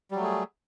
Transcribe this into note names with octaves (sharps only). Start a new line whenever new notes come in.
F#3 G3 A3 G#4